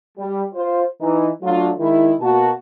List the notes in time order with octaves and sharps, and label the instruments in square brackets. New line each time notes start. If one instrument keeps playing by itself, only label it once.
[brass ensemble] G3
F4 C5
E3 D#4
F#3 A3 D4 F4
D#3 G#3 E4
B2 A#3 F#4 A5